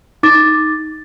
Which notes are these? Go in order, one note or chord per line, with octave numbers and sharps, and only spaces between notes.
D#4 D6 A6